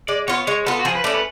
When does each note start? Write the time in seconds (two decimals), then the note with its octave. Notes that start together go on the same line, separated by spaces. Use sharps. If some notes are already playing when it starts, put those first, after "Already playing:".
0.08 G#3 D5
0.28 B3 F4 C#5
0.47 G#3 C#5
0.66 B3 F4 A4
0.79 F#4
0.85 F3 G#4
0.95 B4
1.04 A3 C#4 D5
1.14 B4